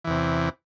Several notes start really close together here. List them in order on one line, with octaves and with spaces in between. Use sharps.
E3 E2 C3